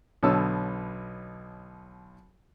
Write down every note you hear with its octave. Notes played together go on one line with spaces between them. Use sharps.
B1 B2 D3 C#5 A5 E6